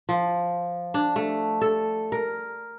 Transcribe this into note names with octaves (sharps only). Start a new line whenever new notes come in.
F3
D4
A3
A4
A#4